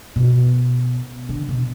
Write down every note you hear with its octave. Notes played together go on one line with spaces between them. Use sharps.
B2
D3
B2